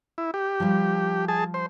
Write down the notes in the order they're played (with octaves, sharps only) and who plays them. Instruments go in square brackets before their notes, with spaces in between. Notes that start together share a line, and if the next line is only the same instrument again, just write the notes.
[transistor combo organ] E4
G4
[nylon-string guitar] F3 G3
[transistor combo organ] G#4 A5
C5